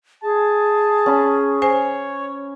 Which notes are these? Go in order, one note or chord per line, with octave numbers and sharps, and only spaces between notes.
G#4 A5
C#4 B5
C5 C#5 G#5